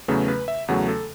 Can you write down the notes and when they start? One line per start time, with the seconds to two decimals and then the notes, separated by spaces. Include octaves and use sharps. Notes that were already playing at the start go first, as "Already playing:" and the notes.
0.08 E2 C#3 F#3 A3 B4
0.28 B4
0.48 E5
0.68 E2 C#3 F#3 A3 F#5
0.88 A4